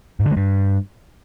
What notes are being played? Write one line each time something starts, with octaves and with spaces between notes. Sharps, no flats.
G#2
D3
G#3
G2